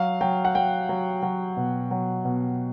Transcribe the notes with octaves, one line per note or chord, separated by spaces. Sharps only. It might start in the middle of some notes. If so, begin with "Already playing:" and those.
Already playing: F#3 F5
F#3 G5
F#5
F#3 G5
F#3
F#3
B2
F#3
B2